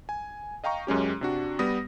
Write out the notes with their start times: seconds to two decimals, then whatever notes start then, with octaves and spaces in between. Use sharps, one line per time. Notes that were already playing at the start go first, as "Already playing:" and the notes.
0.09 G#5
0.64 D#5 F5 G5 A#5 C#6
0.87 F#2 G#3 C#4 G4
1.21 C3 D4 F#4
1.59 G3 B3 D#6 A#6